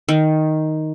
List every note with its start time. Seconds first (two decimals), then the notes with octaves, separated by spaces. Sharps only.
0.09 D#3